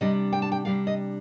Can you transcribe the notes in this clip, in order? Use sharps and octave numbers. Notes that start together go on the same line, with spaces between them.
C3 G3 D4 D#5
G5
A5
G5
C3 G3 D4 F5
D#5